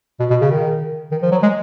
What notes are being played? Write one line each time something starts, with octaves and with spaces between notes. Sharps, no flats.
B2
B2
C#3
D#3
D#3
F3
F#3
G#3